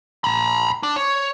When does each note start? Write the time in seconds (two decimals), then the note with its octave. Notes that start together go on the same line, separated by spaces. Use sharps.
0.24 A#5 B5
0.83 D4
0.96 C#5